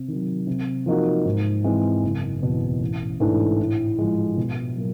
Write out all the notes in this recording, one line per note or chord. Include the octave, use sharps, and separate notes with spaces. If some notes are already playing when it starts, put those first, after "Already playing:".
Already playing: C3
D#3 F#3
C3
F3 A#3 D#4 F#4
G#2
E3 G#3 C4
F#1
E2 B2
A1
G#2 E3 A3 D4
A2
F3 G#3
B2
F#3 A#3